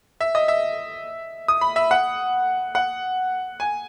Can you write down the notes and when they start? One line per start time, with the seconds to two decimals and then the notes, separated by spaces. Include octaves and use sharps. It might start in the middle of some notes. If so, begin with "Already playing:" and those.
0.21 E5
0.35 D#5
0.48 E5
1.48 D#6
1.61 B5
1.76 E5
1.91 F#5
2.75 F#5
3.60 G#5